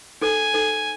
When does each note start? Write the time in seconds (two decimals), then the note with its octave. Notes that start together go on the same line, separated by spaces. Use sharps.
0.21 D#4 A4 C5 G#5
0.54 D#4 A4 C5